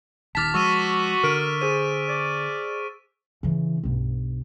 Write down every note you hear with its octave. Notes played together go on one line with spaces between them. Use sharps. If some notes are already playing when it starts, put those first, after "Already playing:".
D#1 D#2 A5 D6 F6 A6 B6
F3 G#3 F#4 C#6 E6 D#7
D3 A#4 F6 D7 D#7
G#4 C5 D#7
D5
C#3 E3
B1 G2